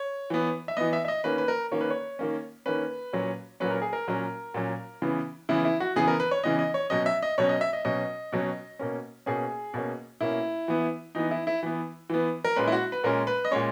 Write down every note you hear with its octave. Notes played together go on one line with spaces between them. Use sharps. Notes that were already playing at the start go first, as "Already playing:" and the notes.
Already playing: C#5
E3 B3
E5
E3 B3 D#5
E5
E5
D#5
D#3 A#3 C#4 B4
B4
A#4
D#3 A#3 C#4 C#5
B4
C#5
D#3 A#3 C#4
D#3 A#3 C#4 B4
A#2 F#3 C#4
A#2 F#3 C#4 B4
A#4
G#4
A#4
A#2 F#3 C#4
A#2 F#3 C#4
C#3 E3 B3
C#3 E3 B3 E4
E4
F#4
C#3 E3 B3 G#4
A#4
B4
C#5
C#3 E3 B3 D#5
D#5
C#5
B2 F#3 C#4 D#5
E5
D#5
B2 F#3 C#4 C#5
D#5
E5
D#5
B2 F#3 C#4 D#5
B2 F#3 C#4
B2 A#3 C#4
B2 A#3 C#4 G#4
B2 A#3 C#4
B2 A#3 C#4 E4
E3 B3
E3 B3 D#4
E4
E4
E3 B3
E3 B3
A#4
A#2 G#3 C#4 B4
E4
F#4
B4
A#2 G#3 C#4 A#4
B4
D#5
A#2 G#3 C#4 C#5